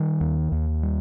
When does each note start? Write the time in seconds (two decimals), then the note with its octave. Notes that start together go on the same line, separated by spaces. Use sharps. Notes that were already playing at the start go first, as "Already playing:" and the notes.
Already playing: D#3 G3
0.21 D#2
0.52 D#2
0.83 G3